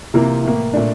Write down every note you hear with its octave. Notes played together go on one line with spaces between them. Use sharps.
C3 E3 A#3 F4
A2 E3 A#3
A#2 A3 D4